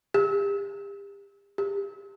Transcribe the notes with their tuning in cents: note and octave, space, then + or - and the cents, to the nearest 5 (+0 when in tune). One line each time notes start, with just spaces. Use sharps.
G4 +35
G4 +25